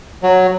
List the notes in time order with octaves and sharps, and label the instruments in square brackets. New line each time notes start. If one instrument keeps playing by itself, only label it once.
[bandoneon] F#3